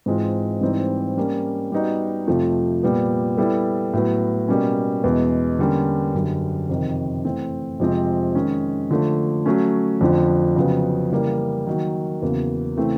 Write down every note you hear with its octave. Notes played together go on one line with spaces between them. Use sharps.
G#2 E3 G#3 C4 F4
G#2 E3 G3 C4 D#4
G3 A#3 C#4
G3 B3 D#4 F#4
F2 C3 F3 A3
A#2 G3 B3
G3 B3 E4 A4
A2 F#3 B3
B2 G3 A#3 C#4
E2 B2 G#3 B3
D3 G3 A#3 C#4
F#2 D3 G3
F2 C3 D#3
E3 A3 C4
F2 C3 F3 G#3 C4
D#3 G#3 C#4
D3 F3 A3
F#3 A3 C#4
F2 D3 F3
F2 C#3 F#3 B3
C#3 E3 G3 A#3
D#3 F#3 A#3
E2 C#3 F#3 A#3
C#3 E3 A3 C4 E4